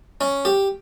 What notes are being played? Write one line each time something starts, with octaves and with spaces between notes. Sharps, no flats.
C#4
G4